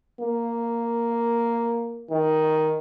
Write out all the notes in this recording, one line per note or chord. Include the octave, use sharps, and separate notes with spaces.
A#3
D#3